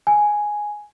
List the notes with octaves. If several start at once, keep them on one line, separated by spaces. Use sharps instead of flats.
G#5